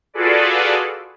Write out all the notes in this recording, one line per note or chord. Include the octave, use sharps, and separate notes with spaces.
F4 F#4 G#4 A4 B4 D5